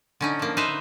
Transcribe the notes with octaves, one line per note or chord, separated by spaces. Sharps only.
D3 C#4 D#4
F3 A#3
D#4 B4 C5 E5